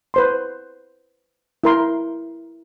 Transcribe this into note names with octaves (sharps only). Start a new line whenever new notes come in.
B4 C5 C6
E4 A#4 C6